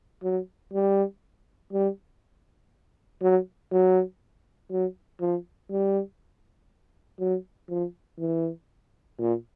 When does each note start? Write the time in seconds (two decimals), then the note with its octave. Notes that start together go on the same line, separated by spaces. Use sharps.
0.23 F#3
0.73 G3
1.73 G3
3.22 F#3
3.72 F#3
4.71 F#3
5.20 F3
5.70 G3
7.20 F#3
7.69 F3
8.19 E3
9.19 A#2